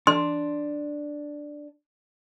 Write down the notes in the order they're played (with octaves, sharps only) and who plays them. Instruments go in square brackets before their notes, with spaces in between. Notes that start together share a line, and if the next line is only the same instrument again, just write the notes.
[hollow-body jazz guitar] D4 [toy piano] C6